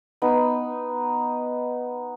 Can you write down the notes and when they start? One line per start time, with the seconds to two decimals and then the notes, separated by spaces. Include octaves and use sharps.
0.22 B3 D#4